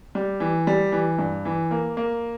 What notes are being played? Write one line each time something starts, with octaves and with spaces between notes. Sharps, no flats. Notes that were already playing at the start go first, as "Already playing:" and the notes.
G3
E3
G3
E3
G2
E3
A#3
A#3